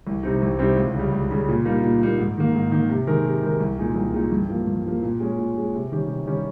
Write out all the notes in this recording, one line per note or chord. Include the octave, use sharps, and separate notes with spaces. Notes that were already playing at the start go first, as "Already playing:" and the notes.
C2
C3 G3 C4 D#4
C2
C3 G3 C4 D#4
C#2
C#3 G3
C#2
C#3 G3
A#2
G3 A#3 D#4
A#2
G3 A#3 D#4
G#2
D#3 A#3
G#2
D#3 A#3
C3
D#3 G#3 D#4 A#4
C3
D#3 G#3 D#4 A#4
C2
A#2 G#3 D#4 G#4
C2
A#2 G#3 D#4 G#4
G2
F3 A#3
G2
F3 A#3
A#2
G#3 C#4 G#4
A#2
G#3 C#4 G#4
C3
D#3 G3 C#4 G4
C3
D#3 G3 C#4 G4